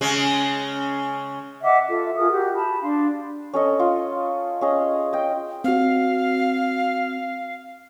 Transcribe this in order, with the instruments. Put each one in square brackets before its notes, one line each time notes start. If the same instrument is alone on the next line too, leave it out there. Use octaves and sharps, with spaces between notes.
[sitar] C#3 G#3
[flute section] D#5 E5 F#5 D6
F4 A4 E5
F4 G#4 A#4 D#6
F#4 G4
A5 B5
D4 F5 C6
[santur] C#4 A4 D#5
F4
C#4 G#4 D#5
D#5 G5
[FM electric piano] C4 F#4 [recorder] F5